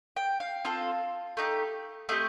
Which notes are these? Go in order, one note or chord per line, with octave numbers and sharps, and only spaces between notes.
G5
F5
C4 F4 A4
A3 D#4 G4
A3 C4 G4 D#5